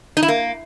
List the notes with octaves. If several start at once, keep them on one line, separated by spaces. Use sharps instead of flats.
D#4
E4
A#3